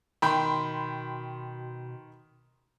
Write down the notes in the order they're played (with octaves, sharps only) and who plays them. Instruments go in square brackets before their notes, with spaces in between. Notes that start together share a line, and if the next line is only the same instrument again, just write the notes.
[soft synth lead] B2 [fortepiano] D#3 G5 [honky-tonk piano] B5 C6